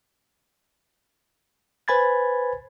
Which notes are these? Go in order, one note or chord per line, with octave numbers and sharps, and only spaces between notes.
B4 C5 G#5 B5 G#6 A6